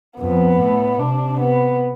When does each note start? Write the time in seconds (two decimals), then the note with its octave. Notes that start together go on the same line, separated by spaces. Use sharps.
0.19 F2 B3
0.59 A2
0.99 C3 D4
1.40 B3